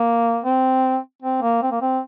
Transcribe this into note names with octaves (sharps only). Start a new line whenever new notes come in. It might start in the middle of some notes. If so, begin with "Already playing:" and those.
Already playing: A#3
C4
C4
A#3
C4
A#3
C4